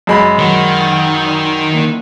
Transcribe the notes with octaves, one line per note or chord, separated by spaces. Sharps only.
F#2 G#3 B5
D3 D#3 F#3
G5 G#5
D5 C6 D#6
D3 A#3 E4